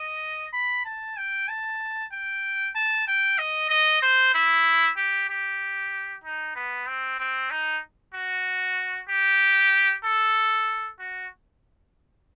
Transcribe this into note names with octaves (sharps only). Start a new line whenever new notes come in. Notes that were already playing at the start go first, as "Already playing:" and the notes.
Already playing: D#5
B5
A5
G5
A5
G5
A5
G5
D#5
D#5
C5
E4
G4
G4
D#4
B3
C4
C4
D#4
F#4
G4
A4
F#4